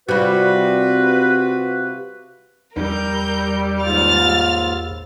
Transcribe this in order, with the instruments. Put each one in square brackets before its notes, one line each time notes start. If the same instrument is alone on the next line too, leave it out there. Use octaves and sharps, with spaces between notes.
[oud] C3 G3 [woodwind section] F4 F#4 B4
[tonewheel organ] E2 [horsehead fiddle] G3 [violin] A#4 G6
[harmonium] D#2 G#2 F4 [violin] F6 A6